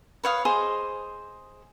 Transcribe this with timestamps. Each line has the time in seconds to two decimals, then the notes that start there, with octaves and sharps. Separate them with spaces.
0.23 B4 C#5 F5 D#6
0.45 G#4 C5 D#5